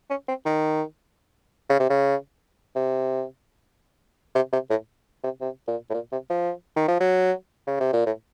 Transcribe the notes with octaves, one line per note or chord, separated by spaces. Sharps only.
C#4
C4
D#3
C#3
C3
C#3
C3
C3
C3
A2
C3
C3
A#2
A2
A#2
C3
F3
D#3
F3
F#3
C#3
C3
A#2
A2